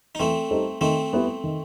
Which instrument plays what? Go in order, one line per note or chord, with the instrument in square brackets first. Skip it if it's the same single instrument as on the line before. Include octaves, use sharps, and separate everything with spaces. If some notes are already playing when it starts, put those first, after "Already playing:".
[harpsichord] D#4
[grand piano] E3 [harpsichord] A3 C4
[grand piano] G3 D#4 A4 C5
[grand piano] D#3 [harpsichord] A3 C4
[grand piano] G3 B3 E4 B4
D#3